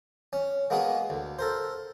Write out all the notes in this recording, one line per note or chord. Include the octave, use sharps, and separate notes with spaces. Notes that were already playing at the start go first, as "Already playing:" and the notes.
C#4
G#3 A#3 B3 F#4 G#4
D2
A4 A#4 C5